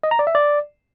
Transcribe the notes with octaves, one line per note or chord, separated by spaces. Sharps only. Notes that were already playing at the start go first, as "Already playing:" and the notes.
D#5
A#5
D5
E5
D5